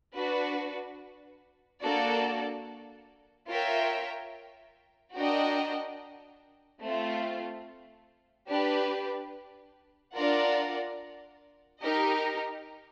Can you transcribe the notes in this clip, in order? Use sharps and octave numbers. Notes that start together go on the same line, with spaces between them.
D4 F#4 B4
A#3 D4 F#4 A4 D5
F4 A#4 C#5 E5 G5
D4 F#4 A#4 D#5 G5
A3 C4 F4
D4 G4 B4
D4 F4 A#4 D5 F#5
D#4 G4 A#4 D#5